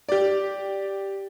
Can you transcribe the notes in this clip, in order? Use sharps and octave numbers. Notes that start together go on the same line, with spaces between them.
G4 D5